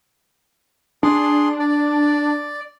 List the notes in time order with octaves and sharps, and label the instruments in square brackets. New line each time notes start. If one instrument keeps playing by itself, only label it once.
[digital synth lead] D4 [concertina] G#4 C6
[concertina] D5